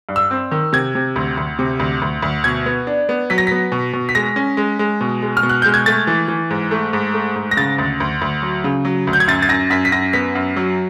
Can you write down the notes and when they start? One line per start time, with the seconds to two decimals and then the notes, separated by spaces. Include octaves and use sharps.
0.09 G2
0.16 E6
0.31 C4
0.51 D#3
0.73 C3 G#6
0.95 C3
1.16 D2
1.37 D2
1.59 C3
1.80 D2
2.02 D2
2.22 D2
2.44 B2 G#6
2.66 B3
2.87 D4
3.09 B3
3.30 F#3 B6
3.38 A#6
3.47 B3 B6
3.72 B2
3.93 B2
4.09 B6
4.15 G#3 A#6
4.36 C#4
4.57 G#3
4.79 G#3
5.01 B2
5.23 G#3
5.37 F6
5.43 B2
5.49 F#6
5.62 G#3 G6
5.74 G#6
5.86 A3 A6
6.07 E3
6.28 E3
6.50 G#2
6.71 A3
6.93 G#2
7.14 A3
7.36 G#2
7.51 A#6
7.57 C#3 A6
7.78 D2
8.00 D2
8.21 D2
8.42 F#3
8.64 C#3
8.85 F#3
9.07 D2
9.13 G6
9.20 G#6
9.28 F#2 A6
9.42 A6
9.49 F#2 A#6
9.70 F#2 B6
9.85 B6
9.92 F#2 A#6
10.13 B3 B6
10.35 F#2
10.56 F#3